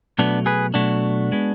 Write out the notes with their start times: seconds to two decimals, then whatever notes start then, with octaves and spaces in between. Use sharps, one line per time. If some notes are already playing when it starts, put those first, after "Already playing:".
0.19 B2 F#3 A3 B3 D4
0.46 G#4 B4
0.74 B2 F#3 A3 D4 F#4
1.32 G#3 B3